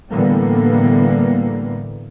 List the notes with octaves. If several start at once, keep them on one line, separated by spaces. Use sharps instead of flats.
A2 D3 E3 G3 A#3 B3